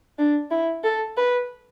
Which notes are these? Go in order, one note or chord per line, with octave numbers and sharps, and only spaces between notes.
D4
E4
A4
B4